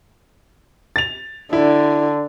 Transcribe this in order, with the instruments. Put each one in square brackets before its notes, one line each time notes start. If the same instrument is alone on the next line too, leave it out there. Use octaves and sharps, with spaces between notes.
[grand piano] A6 F7
[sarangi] D3 [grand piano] E4